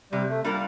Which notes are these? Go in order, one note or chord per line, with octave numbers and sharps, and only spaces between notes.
C3 G3
A3
G3 A#3 D4 F4 A#4